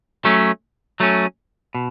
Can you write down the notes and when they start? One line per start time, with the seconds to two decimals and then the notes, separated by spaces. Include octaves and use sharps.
0.25 F#3 A3 C#4
1.00 F#3 A3 C#4
1.75 B2